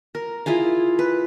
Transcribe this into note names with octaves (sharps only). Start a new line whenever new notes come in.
A#4
E4 F4 G#4 F5
B4